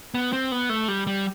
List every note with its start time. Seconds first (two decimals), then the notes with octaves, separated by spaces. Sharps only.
0.14 B3
0.33 C4
0.52 B3
0.69 A3
0.88 G3
1.07 G3